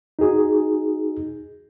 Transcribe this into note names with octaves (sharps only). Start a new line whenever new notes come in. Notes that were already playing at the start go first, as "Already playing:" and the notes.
D#4 F#4 G#4